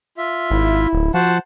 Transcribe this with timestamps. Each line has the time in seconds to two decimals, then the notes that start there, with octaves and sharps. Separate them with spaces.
0.18 F4 E5
0.50 G#1 E4
0.93 D1
1.14 F3 F#4 C5 F#5 A5